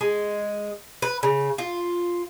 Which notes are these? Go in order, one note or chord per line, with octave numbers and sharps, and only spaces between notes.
G#3
B4
C#3
F4